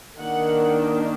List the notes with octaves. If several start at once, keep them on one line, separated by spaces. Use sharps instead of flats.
D#3 A#3 D4 F#5